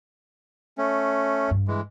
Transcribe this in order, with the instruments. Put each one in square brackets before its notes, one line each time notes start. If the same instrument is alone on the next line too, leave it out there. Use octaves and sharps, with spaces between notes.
[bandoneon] A3 C#4
[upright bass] G2
[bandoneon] E3 G#3